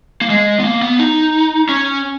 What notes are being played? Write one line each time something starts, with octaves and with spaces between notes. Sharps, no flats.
A#3
G#3
B3
A#3
B3
D#4
C#4